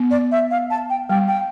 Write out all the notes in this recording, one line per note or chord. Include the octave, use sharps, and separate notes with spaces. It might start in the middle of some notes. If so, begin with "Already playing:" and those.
Already playing: B3
D5
E5
F5
A5
G5
G3 G5
G5